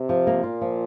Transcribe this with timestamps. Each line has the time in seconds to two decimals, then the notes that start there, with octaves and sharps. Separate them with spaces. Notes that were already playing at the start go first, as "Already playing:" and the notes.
Already playing: C3
0.09 F3
0.27 A#3
0.44 A#2 F4
0.61 F3